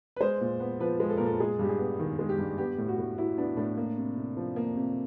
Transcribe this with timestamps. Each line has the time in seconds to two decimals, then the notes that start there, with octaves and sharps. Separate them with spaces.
0.16 B4
0.20 G#3 C5
0.41 A#2
0.60 B3
0.80 F3 B4
1.00 G#3
1.10 A4
1.17 A#2 A#4
1.26 A4
1.40 G#3 G#4
1.59 G2 G4
1.69 G#4
1.79 B3
1.99 D#3
2.19 G#3
2.29 G4
2.38 G2
2.58 B3 G4
2.78 A2
2.88 F#4
2.98 A2
3.18 F#3 E4
3.38 B3 D4
3.57 A2 D4
3.77 A#3
3.97 C3
4.17 C3
4.37 F3
4.56 A#3
4.76 C3